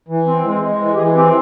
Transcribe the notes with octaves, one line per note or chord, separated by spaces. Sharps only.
E3
C4
G#3
G#3
E3
G4
E3 G#4
C4 G4